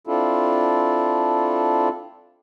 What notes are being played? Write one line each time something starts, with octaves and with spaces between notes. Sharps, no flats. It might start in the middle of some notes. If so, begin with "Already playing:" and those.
C4 D4 E4 F4 A4